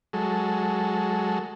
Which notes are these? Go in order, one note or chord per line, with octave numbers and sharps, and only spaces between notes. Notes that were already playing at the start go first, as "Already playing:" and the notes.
F#3 G#3 A4